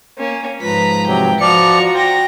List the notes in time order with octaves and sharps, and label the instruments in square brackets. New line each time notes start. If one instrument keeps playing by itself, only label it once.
[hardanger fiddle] A#3 C#4
[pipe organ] G#2 F3 [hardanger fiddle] B4 A#5 [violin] B6
[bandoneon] C3 F#3 [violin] G5
[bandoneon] F3 D5 [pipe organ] F4 [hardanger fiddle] F#4 A#5 [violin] C#7 F7
[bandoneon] C5 [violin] G5 A#6